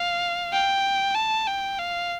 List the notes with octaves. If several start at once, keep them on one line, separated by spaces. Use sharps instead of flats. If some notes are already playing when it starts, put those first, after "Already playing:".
Already playing: F5
G5
A5
G5
F5